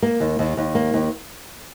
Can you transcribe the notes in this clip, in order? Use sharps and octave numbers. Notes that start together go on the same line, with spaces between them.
A#3
D#2
D#2
D#2
A#3
D#2